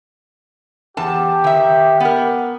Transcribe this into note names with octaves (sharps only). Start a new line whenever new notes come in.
E2 G4 A5
D#3 E5
B3 A#4